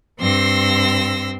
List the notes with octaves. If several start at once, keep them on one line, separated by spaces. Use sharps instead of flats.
G2 C4 C6 E6 A#6